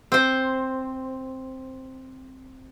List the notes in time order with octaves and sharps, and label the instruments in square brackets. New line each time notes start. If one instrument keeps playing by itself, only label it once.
[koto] C4 C5